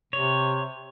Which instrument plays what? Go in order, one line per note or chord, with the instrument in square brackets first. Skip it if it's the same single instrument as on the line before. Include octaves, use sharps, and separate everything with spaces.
[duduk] C3 [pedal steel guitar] C#5